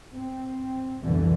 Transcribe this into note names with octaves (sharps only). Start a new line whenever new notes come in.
C4
C2 F2 B2 D3 E3